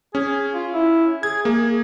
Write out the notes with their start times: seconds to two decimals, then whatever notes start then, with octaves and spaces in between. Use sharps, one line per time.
0.15 C#4 G#4
0.54 F4
0.74 E4
1.23 G#4 G#6
1.45 A#3 G#4